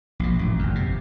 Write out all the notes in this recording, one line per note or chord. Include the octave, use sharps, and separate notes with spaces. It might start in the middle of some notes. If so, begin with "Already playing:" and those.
A#1 F#2 B2
A1 A#2
G1 F2
C3